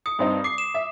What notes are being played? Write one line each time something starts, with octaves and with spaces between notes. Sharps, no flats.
D#6 C#7
G2 C4 D#4
D6 C7
E7
E5